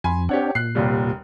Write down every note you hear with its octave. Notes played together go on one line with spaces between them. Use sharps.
F2 G#5 B5 C6
C4 D4 G4 C#5 F#5
A#2 F#6 C7
F1 D#2 G3